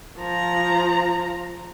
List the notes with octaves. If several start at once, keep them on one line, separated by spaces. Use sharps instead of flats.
F3 A#5